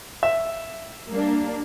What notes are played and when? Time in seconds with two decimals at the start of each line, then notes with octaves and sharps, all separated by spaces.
0.23 E5
1.09 G3 A#3 D4